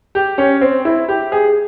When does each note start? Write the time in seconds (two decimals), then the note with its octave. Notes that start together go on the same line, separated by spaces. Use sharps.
0.15 G4
0.38 C#4
0.61 C4
0.85 E4
1.08 G4
1.32 G#4